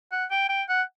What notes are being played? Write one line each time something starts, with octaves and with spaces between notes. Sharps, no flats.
F#5
G5
G5
F#5